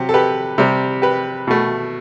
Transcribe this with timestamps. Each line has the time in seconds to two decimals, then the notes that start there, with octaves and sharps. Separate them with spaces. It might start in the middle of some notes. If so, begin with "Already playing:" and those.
Already playing: C3 F#3 G4
0.09 A4
0.14 G4 B4
0.58 C3 G3
1.02 G4 B4
1.47 B2 A3